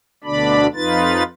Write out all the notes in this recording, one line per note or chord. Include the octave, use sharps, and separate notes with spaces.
D2 B2 D3 D4 D5 B5
F2 D#4 F4 B4 A6